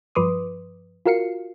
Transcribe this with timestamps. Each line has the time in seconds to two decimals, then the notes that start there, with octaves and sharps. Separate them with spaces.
0.15 G2 F3 B4 C6 D6 D#6
1.06 F4 F#4 A#4 F5 C7 C#7